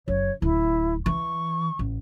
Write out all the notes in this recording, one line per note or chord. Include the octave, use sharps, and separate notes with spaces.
F#1 C#5
D1 E4
E3 C#6
A1